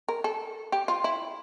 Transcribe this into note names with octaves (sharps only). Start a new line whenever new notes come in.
A#4
A4
G4
F4
E4